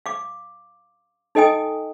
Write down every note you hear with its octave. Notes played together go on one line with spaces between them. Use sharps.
F5 D6
D#4 A4 D#5 G5 G#5 D#6